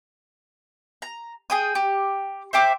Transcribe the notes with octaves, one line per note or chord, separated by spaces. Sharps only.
A#5
G#4 G5 D#6
G4
C5 E5 G5 D6